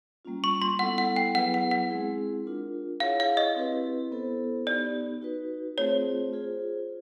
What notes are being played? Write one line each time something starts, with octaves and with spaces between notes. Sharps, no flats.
G3 A#3 C#4 F4
C#6
C6
G3 B3 E4 A4 F#5
F#5
G5
F#3 B3 E4 G#4 B4 F#5
F#5
F#5
G#3 C4 E4 G#4
D4 F4 A#4
E4 G#4 C#5 F5 F#5
F5
D#5
C4 E4 G4 B4
B3 E4 A4 C5
B3 D#4 G4 D5
D#4 F#4 B4
A3 C4 F4 G#4 C5 C#5
F4 G#4 C5